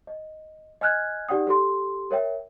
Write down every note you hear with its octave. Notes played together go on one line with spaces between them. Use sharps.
D#5
D#5 G#5 F6 F#6 G#6
D#4 G4 D5 F#5 G5 D#6
G4 A4 C6
A#4 C#5 E5 G5